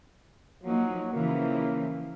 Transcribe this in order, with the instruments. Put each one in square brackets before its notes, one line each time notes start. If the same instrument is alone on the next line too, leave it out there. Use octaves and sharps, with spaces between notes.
[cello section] F3 A#3 D#4 [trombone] F#3
[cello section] C#3 E3 F3 [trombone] A#3